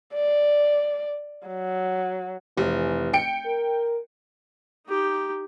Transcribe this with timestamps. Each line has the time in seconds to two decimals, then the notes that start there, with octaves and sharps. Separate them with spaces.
0.14 D5
1.47 F#3
2.57 F1 E3
3.13 G5 C#7 D7
3.46 A#4
4.87 D#4 G4